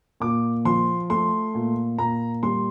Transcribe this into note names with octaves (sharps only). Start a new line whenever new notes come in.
A#2 D6
F3 C6
A3 C6
A#2
A#2 A#5
G3 C6